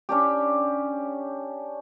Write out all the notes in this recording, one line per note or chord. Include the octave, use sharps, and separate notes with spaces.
C#4 D4 G4